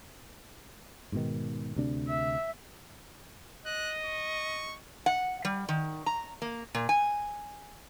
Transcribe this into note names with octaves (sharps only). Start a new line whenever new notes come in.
G#2 B2 D#3
D2 C3 D4
E5
D#5 F#6
C#6
F#5
G3
D#3
A#5
A#3
A#2
G#5